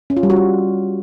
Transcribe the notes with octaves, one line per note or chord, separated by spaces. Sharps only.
C#4
F4
G3
F#4
F4